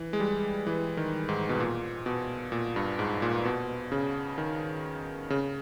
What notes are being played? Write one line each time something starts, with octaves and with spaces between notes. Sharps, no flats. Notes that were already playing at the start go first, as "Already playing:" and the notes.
Already playing: E3
G#3
G3
E3
D#3
G#2
B2
A#2
B2
A#2
G2
G#2
A#2
B2
C#3
D#3
C#3